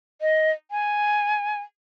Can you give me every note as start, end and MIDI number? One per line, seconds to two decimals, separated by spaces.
0.21 0.51 75
0.71 1.60 80